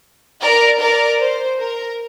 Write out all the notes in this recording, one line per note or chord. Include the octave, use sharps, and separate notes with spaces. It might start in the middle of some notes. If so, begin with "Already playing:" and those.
A#4 D5
A#4 D5
C5
A#4